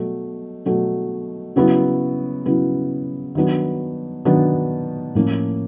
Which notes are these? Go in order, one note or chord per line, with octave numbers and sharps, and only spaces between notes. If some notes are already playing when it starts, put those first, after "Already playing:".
Already playing: B2 F#3 A3
B2 F#3 A3
C#3 F#3 B3 E4
C#3 F#3 B3 E4
D#3 F#3 B3 D4
D#3 F#3 B3 D4
A2 F3 A#3 C#4